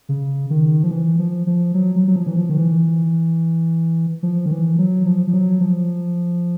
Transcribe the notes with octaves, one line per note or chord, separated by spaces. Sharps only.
C#3
D#3
F3
E3
F3
F3
F#3
F#3
F#3
F3
E3
F3
D#3
E3
F3
D#3
E3
F#3
F3
F3
F#3
F3